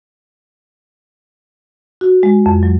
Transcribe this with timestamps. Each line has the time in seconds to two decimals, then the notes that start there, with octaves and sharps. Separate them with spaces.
2.01 F#4
2.23 G#3
2.46 F2
2.63 F#3